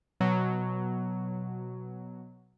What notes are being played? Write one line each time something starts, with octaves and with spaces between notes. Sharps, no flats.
B2 F#3